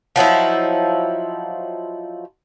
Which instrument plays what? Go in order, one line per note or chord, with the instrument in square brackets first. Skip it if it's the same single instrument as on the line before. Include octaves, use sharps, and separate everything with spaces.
[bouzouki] F3 F#3 D#4 E4